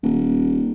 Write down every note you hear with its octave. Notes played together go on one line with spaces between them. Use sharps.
D#1